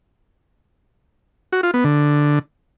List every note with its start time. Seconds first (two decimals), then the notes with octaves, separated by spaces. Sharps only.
1.53 F#4
1.63 F4
1.74 B3
1.84 D3